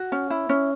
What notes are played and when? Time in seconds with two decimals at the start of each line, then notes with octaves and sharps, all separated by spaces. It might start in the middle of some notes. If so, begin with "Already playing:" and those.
Already playing: F#4
0.12 C#4
0.30 E4
0.49 C#4